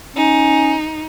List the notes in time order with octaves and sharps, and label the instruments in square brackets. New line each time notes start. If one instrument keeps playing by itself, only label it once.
[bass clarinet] C#4 [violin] D#4